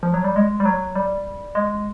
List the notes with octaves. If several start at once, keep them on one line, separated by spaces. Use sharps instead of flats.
F3
F#3
G3
G#3
G3
F#3
G3
G#3